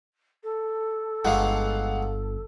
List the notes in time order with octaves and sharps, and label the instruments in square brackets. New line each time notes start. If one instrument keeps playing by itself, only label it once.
[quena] A4
[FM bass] G1 [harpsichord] D#3 E3 G#3 [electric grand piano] F5 F#5